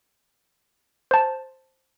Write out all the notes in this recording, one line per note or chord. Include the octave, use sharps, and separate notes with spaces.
C5 A5